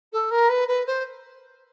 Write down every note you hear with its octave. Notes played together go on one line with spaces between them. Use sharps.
A4
A#4
B4
B4
C5